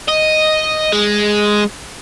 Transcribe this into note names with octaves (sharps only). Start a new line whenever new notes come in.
D#5
G#3